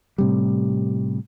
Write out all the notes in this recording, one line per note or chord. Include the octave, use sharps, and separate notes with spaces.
A2 C3 G3